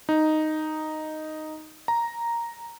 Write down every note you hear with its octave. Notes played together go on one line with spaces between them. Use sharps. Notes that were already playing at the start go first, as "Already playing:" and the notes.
D#4
A#5